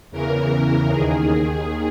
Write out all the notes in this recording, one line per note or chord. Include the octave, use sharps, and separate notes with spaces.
E2 C#3 E3 A#4
D#2 D#3 G#4